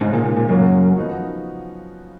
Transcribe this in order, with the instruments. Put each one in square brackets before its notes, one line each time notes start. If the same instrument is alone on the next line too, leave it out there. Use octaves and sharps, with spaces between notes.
[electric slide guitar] G#2 [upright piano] C#3 G#3 D#4
[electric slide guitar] A#2
A#2
A#2
[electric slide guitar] F#2 [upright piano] C#3 F#3 A#3 C#4 F#4
[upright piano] F3 B3 D#4 F#4